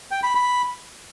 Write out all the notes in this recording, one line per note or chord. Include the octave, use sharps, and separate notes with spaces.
G5
B5
B5